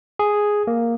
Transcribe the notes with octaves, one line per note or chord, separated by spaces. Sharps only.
G#4
A#3